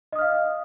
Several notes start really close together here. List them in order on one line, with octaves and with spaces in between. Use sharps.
D#5 D#6 F6 F5